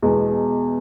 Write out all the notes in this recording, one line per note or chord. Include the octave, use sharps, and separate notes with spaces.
E2 B2 G#3